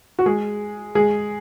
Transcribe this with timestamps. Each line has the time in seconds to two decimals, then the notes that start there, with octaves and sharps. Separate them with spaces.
0.19 F#4
0.26 G#3 G#4
0.95 G#3 G#4